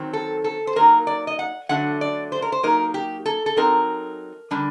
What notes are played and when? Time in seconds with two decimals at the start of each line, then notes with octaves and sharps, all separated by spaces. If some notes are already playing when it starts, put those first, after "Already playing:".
Already playing: D#3 F#3 C4
0.13 A4
0.44 A4
0.67 C5
0.76 F#3 A#3 D#4 A#4
1.07 D5
1.27 D#5
1.39 F#5
1.69 D3 F#3 A3 D4 F#5
2.01 D5
2.32 C5
2.42 A#4
2.52 C5
2.63 F#3 A#3 D#4 A#4
2.94 G4
3.26 A4
3.46 A4
3.57 F#3 C4 D#4 A#4
4.51 D3 G3 D4